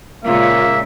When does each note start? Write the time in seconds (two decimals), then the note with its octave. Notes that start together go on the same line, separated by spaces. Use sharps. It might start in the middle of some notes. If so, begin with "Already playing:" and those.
0.25 A#2 C#3 G#3 A#3 F4 E5